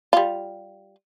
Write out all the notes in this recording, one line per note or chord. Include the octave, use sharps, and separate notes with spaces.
G3 F4